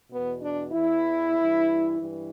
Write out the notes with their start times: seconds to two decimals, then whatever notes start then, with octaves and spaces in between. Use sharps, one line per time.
0.11 E2 B2 B3
0.42 D4
0.73 E2 E3 E4
1.35 G2 E3
1.98 G2 E3